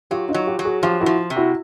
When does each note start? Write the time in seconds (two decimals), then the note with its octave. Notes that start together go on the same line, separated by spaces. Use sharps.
0.11 F#3 F4 G4
0.29 D#4 F4
0.34 F#3
0.47 F4 G4
0.59 F#3
0.65 F#4 G#4
0.82 F3 F4 G4
1.01 E4 F#4
1.06 F3
1.30 C3
1.36 E4 F#4